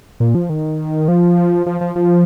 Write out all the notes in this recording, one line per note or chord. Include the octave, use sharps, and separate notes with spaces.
A#2
F3
D#3
F3
F3
F3
F3